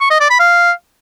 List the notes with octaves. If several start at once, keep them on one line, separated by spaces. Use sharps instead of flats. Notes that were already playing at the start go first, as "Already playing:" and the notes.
C#6
D#5
D5
B5
F5